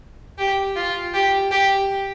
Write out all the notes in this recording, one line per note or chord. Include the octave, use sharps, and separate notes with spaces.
G4
F4
G4
G4